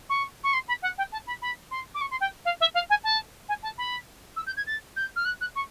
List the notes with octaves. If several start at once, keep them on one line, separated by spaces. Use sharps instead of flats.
C#6
C#6
C6
B5
F#5
G5
A5
B5
B5
C6
D6
C#6
C6
G5
F5
E5
F5
G#5
A5
G#5
A5
B5
E6
G6
G#6
A6
G6
F6
F#6
F#6
C#6